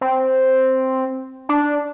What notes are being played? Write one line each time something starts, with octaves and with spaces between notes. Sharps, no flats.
C4
D4